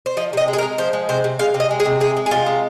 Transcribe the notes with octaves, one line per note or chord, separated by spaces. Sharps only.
C5
F3 D#5
C3 D#5
G#3
G#4
A#4
G#3
F3 C5
G#3
C3 C5
C3
G#3 F5
C3
D#5
G#3
G#4
C3
G#3 G#4
G#3
G#4
C3 F4
G#3